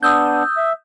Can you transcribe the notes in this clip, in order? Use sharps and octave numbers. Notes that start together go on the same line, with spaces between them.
B3 D4 D#6 E6 G6
E5